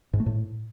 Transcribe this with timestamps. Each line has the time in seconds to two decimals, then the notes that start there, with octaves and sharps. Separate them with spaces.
0.13 G#2
0.20 A3
0.26 A2